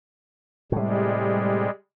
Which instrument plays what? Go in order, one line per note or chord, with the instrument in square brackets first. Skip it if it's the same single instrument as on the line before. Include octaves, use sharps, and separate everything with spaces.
[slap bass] A2 C3 [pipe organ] G3 G#3